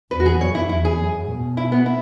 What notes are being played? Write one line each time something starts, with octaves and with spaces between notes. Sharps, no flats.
E2 B4
F#4
G#4
F#2 C#5
E4
E2 E4
G#4
F#2
B2
E4
B3
E4